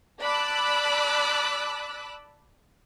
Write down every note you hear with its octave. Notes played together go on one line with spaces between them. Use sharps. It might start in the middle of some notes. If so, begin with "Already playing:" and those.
D5 A5 B5 D6 E6 F#6